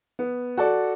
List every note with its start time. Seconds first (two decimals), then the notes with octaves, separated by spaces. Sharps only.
0.19 B3
0.57 F#4 A4 D5